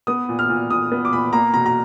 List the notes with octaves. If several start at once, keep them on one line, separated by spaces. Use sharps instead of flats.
B3 D#6
A#2
F6
A#2
A#2 D#6
B3
D6
A#2 B5
A#3 A#5
B2 A#5
A#5